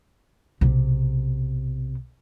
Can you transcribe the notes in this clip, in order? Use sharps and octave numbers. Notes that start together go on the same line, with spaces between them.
B1 C3